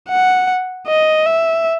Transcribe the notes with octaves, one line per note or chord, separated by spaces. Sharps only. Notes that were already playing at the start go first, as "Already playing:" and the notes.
F#5
D#5
E5